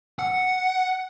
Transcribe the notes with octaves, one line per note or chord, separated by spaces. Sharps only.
F#5